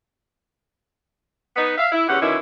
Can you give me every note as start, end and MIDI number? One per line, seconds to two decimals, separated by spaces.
1.56 1.74 59
1.56 1.74 63
1.77 1.88 76
1.77 1.88 77
1.92 2.05 64
2.08 2.20 40
2.08 2.20 50
2.08 2.20 61
2.08 2.20 67
2.08 2.20 78
2.21 2.37 47
2.21 2.37 50
2.21 2.37 51
2.21 2.37 61
2.21 2.37 64